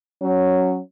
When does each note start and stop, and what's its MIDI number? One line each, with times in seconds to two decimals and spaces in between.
0.22 0.79 54
0.22 0.80 61